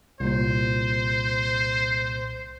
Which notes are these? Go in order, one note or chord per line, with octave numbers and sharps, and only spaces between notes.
C2 A#2 C5